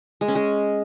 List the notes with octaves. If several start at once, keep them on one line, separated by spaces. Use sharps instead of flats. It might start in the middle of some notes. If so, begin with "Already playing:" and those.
G#3
C#4
G#3